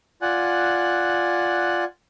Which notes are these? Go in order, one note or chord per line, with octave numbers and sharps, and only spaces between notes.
F4 D5 F#5 G#5 F#6